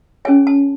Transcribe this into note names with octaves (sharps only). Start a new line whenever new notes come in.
C#4 G#4 C#5 G#5
A5